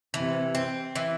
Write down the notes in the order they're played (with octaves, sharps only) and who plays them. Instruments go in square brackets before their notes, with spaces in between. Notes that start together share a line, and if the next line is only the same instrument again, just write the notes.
[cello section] C3 [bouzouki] E3
[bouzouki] C4
E3